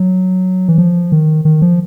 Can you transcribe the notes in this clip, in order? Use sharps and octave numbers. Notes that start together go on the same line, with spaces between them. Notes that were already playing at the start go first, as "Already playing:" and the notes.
Already playing: F#3
E3
F3
D#3
D#3
F3